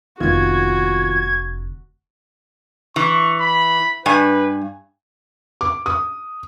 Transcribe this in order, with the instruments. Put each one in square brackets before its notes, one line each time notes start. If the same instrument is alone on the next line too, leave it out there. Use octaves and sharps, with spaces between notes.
[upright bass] F1 D3 [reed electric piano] D#3 B3 F4 [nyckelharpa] F#4 [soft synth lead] G#6
[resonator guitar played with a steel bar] E3 [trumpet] C#6
[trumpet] B5
[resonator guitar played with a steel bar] G2 G#5 [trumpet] B4
[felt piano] D6
D#6